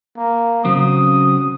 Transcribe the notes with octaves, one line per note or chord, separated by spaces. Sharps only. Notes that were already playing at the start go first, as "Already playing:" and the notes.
A#3
C#3 F#3 C4 D#6